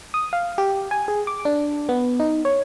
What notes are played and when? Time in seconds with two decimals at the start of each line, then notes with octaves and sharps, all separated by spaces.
0.14 D#6
0.33 F5
0.58 G4
0.91 G#5
1.08 G#4
1.27 D6
1.45 D4
1.89 B3
2.20 D#4
2.45 C#5